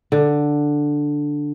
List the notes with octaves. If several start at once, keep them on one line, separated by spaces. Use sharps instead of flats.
D3